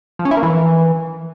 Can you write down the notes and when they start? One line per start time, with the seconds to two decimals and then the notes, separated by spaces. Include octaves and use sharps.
0.19 F3
0.25 C#4
0.31 E4
0.37 A#3
0.43 E3